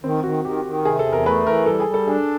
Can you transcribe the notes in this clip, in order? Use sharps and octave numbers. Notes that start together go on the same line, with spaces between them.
D#3 C4
D#3 F#4
D#3 G4
D#3
C3 G#4
A4
E2
A#4
A3 B4
E3 A#4
G3 A4
G#4
G3
A4
D4 G#4